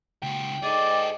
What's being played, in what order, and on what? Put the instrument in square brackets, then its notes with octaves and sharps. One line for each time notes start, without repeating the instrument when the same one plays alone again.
[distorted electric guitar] C#2 F#4 [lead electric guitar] G5
[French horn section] G#2 D#5 [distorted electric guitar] G#4 A4 [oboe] D5